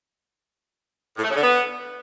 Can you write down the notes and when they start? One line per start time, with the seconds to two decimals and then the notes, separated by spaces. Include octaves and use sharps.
1.17 A2
1.23 A3
1.29 C#3
1.36 D3
1.42 B3